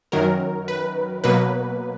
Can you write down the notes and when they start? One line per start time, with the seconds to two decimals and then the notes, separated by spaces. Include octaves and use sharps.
0.12 F#2 D#3 F#3 A#4
0.68 B4
1.24 B2 F#3 A#3 B4